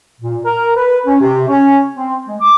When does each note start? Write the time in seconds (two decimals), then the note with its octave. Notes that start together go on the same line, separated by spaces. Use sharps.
0.20 A#2
0.45 A#4
0.77 B4
1.06 C#4
1.20 C3
1.48 C#4
1.96 C4
2.27 G#3
2.40 D6